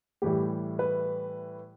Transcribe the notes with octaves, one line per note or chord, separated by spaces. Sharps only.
A2 E3 G3 G4
B4